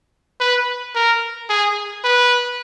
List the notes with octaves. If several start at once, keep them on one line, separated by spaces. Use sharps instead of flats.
B4
A#4
G#4
B4